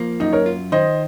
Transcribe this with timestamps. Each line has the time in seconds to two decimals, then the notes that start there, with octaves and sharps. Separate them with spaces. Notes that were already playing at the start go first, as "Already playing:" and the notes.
Already playing: F3 A#3
0.20 F#2 D#4
0.33 A#4 C#5
0.46 F4
0.72 D#3 C5 D#5